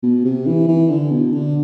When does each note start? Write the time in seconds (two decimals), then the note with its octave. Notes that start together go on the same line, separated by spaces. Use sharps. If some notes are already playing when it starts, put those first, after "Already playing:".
0.03 B2
0.24 C3
0.46 E3
0.68 E3
0.90 D3
1.11 B2
1.33 D3